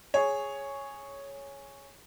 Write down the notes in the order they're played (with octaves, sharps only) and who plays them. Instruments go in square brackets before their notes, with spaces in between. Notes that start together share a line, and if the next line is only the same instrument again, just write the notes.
[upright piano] G#4 C#5